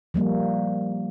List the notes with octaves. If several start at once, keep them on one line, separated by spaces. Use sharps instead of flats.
F3 G3 A#3